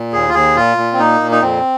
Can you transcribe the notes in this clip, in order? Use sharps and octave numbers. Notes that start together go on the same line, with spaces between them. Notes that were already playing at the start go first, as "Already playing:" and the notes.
Already playing: A#2
D#2 G#4
F4
D#2 G#4
A#2 F4
A#2
C4
A#3 D#4
A#2
D#4
F2 C4